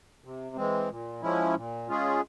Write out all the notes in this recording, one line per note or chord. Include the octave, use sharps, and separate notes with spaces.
C3
E3 G#3 C4
A#2
F3 G#3 C#4 E4
A#2
G#3 C#4 F4 G#4